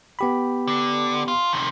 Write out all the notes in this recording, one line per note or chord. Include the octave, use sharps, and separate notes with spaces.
B3 G4 B5
D3
F4
C3 D#3